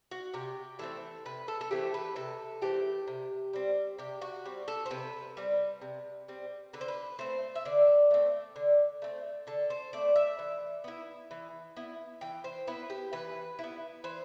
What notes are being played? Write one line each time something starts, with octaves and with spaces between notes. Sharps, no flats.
F#4
C3 G4
E3 A3 C4 A4
C3 B4
A4
A4
E3 A3 C4 G4
B4
C3 A4
E3 A3 C4 G4
C3
G3 C4
C3 G4
F#4
G3 C4
A4
C5
C3 B4
G3 C4
C3
G3 C4
D3 B4
C5
B4
A3 C4 C5
E5
D3 D5
A3 C4
D3
A3 C4
D3 A4
C5
A3 C4 D5
E5
E3
B3 E4
E3
B3 E4
E3 G5
C5
B3 E4 B4
G4
E3 B4
B3 E4
E3 C5